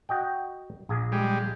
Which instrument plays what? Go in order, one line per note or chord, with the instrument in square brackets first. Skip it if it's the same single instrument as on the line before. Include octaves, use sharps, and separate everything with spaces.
[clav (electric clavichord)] F#4 D#5 G5
A#1 G#4
[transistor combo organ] G3 G#3